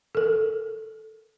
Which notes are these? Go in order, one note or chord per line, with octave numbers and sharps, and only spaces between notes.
A4 A#4